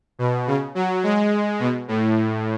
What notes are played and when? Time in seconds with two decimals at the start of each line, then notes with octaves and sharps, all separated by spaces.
0.19 B2
0.47 C#3
0.75 F#3
1.03 G#3
1.59 B2
1.88 A2